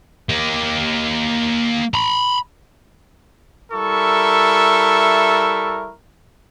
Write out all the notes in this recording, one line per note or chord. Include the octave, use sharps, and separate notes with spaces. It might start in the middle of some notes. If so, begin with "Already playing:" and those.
A#3 G4
A#5 B5
G3 E4 A4 A#4 E5 C#6